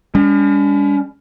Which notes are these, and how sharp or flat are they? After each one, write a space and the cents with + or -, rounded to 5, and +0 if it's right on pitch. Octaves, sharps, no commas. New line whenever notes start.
G3 +45 C#4 +45